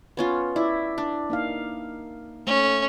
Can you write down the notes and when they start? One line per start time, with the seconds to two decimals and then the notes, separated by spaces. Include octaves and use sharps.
0.17 B3 C#4 F4
0.56 E4 D5 E5
0.98 D4
1.30 A#3 D#4 F5
2.47 A3 C#4